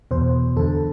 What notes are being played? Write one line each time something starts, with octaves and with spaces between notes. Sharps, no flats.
E2 B2 C5
E2 D3 A4